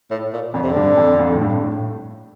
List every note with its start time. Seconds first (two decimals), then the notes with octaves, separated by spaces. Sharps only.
0.11 A2
0.33 A#2
0.54 F2 D3
0.63 C3
0.71 G2 D3
0.97 F2
1.19 F2
1.32 A2
1.41 G2
1.63 A2